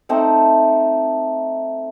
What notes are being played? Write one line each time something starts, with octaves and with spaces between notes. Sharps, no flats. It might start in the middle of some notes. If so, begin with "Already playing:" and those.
A3 C4 D#4